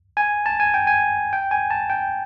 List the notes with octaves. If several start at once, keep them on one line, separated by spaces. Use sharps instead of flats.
G#5
A5
G#5
G5
G#5
G5
G#5
A5
G5